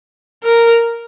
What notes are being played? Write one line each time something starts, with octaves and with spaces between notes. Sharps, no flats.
A#4